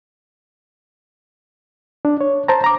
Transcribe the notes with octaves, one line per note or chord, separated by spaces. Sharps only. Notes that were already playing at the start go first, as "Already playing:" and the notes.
D4
C#5
C5 A5 A#5
A#5 D6